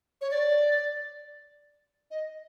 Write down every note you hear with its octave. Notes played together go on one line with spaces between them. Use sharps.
C#5
D5
D#5